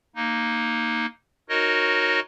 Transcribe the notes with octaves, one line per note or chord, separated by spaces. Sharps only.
A#3 D#4
D#4 F#4 A#4 C#5 D#5